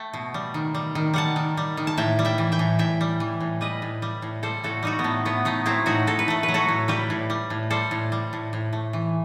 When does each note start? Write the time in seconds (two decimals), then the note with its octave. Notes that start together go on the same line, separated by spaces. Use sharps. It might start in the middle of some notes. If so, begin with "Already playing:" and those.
Already playing: A3 E5 G5
0.13 B2
0.34 G3
0.54 D#3
0.74 G3
0.95 D#3
1.14 G3 F#5 A5
1.36 D#3
1.57 G3
1.77 D#3
1.87 A5
1.97 A2 E5 G5
2.19 G3
2.25 E5 G5
2.38 E3
2.52 E5 G5
2.59 A2
2.79 A2 E5 G5
3.01 G3
3.20 E3
3.40 A2
3.61 G3 B4 D#5
3.82 A2
4.02 G3
4.22 A2
4.43 G3 A4 C5
4.64 A2 F#4 A4
4.83 G3 D#4 F#4
4.99 B3
5.04 A2 A3
5.25 A2 B3
5.45 A3 B3 D#4
5.66 F#3 C4 E4
5.86 A2 D#4 F#4
6.07 A2 A4
6.19 B4
6.28 A3 A4
6.43 B4
6.48 F#3
6.54 F#4 A4
6.69 A2
6.88 G3 G4 B4
7.10 A2
7.30 G3
7.50 A2
7.70 G3 A4 C5
7.91 A2
8.12 G3
8.33 A2
8.53 A2
8.73 A3
8.93 E3